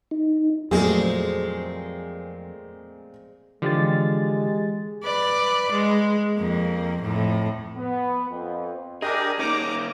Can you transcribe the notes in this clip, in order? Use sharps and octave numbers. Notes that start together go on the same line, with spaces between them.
D#4
F2 A#2 F#3 G#3 A3 C4 G#4
D3 E3 F3 G#3 G4 A6
B4 D5
G#3
F2 A#3
F2 A2
B3
F2
D4 G4 G#4 A#4 D#5 D6
A#3 C#4 D#4 A#5 D6